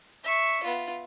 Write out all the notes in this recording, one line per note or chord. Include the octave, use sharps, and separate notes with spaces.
E5 C#6
B3 F4